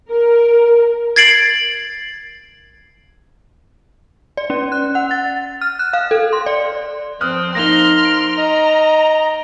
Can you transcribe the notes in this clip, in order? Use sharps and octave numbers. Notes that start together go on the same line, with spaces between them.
A#4
G#6 A6 C7 D7 F#7
D5
C#4
F#6
F#5
A6
F6
F#6
F5
A4
C6
D5
F3 C4 D#6 F6 F#6
A#3 D#4 C6 F6 A#6 G7
D7
D#5 A#5